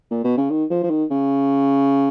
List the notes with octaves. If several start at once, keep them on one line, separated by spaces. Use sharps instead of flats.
A#2
B2
C#3
D#3
F3
F3
D#3
C#3